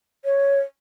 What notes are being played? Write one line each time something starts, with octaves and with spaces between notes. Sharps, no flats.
C#5